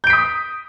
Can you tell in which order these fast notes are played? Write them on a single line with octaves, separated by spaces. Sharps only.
G6 D7 B6 D#6